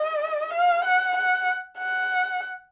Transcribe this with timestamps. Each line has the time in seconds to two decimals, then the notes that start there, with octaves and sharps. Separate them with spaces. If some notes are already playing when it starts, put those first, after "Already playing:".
Already playing: D#5
0.53 F5
0.85 F#5
1.17 F#5
1.79 F#5